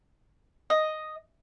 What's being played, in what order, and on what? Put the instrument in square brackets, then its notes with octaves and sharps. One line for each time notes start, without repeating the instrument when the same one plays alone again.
[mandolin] D#5